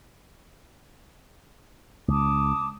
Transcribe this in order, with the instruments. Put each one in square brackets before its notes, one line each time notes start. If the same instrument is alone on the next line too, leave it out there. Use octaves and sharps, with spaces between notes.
[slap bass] C#2 [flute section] A5 D6 D#6